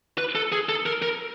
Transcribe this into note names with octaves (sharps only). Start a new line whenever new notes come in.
B4
A4
G#4
A4
A#4
A#4